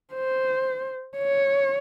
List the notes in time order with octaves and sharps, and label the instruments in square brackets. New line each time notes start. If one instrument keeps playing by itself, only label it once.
[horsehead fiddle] C5
C#5